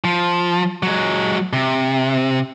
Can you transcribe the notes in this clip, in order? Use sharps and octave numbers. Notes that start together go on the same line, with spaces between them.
F3
F#3 G#3
C3